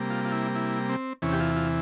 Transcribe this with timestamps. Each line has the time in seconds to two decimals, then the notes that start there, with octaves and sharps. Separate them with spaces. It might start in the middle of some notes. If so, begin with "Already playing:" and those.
Already playing: C3 G3 A#3
0.10 F4
0.25 F4
0.32 E4
0.55 E4
0.89 C4
1.22 E2 C3 E3 C#4
1.32 G4
1.40 F4
1.56 F4